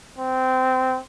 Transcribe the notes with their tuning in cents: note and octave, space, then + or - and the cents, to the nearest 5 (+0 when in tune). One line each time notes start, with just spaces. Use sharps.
C4 -20